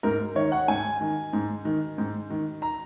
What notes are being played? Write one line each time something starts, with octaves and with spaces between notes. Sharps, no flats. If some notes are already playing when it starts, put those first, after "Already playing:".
G#2 A#4
D#3 C#5
F#5
G#2 G#5
D#3
G#2
D#3
G#2
D#3
A#5